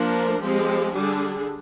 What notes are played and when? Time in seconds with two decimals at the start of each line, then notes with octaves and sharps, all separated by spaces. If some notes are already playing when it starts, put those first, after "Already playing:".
Already playing: F3 A#3 D4 A#4
0.42 F3 G#3 C4 G4
0.92 D3 G3 D4 G#4